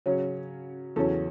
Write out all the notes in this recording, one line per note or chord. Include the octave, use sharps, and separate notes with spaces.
C#3 F#3 C#4 C#5
E2 C#3 F#3 C#4 A4